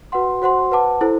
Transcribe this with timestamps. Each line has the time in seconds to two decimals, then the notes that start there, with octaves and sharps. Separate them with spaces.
0.12 F#4 B4 F#5 C6
0.42 F#4 C5 F#5 C6
0.72 B4 F#5 A5 D6
1.01 E4 A4 C5